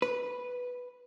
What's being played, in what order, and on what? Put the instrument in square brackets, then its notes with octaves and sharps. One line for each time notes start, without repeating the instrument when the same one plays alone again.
[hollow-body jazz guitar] B4